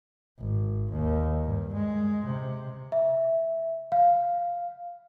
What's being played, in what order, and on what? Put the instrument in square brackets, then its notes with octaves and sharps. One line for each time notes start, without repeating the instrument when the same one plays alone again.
[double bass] G#1
D#2
G2
G#3
C3
[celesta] E5
F5